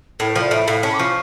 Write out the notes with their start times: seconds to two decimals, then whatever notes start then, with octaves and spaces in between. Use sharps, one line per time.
0.19 A2 A#4
0.30 C#5
0.36 F3 D5
0.51 A2 E5
0.67 A2 F5
0.83 C#4 A5
0.94 D6
0.99 F3 C#6